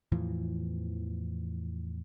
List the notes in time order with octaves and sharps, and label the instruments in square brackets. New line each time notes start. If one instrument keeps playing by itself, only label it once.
[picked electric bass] E2 A2 E3 F3